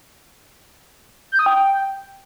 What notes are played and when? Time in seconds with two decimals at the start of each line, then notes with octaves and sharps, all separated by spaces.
1.32 G6
1.39 D#6
1.46 G5